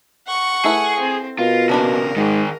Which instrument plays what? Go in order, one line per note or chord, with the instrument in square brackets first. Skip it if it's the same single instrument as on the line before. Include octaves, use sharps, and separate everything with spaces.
[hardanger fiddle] F#5 C#6
[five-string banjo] A3 E4 B4 [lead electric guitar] G#4
[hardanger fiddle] C4
[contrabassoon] B2 [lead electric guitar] F4 [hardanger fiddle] A#4
[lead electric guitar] A#2 C#3 [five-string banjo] A#3 D4 B5
[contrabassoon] G#2 [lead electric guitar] D#3 G#4